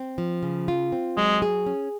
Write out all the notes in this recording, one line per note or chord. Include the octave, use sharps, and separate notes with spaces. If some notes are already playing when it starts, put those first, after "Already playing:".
Already playing: C4
F3
C#3
F4
C4
F#3 G#3
G#4
C#4